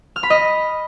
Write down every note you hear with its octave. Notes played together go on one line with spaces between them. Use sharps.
F6
B5
D#5